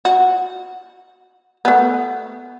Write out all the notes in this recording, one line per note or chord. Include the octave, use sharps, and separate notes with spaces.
F#4
A3 B3